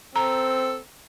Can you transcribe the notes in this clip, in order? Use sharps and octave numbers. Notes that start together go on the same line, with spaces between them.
C4 A4 A#5